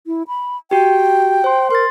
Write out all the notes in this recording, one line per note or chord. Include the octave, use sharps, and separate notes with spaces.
E4
B5
F#4 G4 G5
C5 C6
A#4 C6 A6